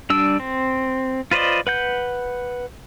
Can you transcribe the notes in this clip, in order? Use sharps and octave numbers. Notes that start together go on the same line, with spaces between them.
G3 D4 E6
C4
F4 B4 C5 D5 D#5
B4 F#5 G6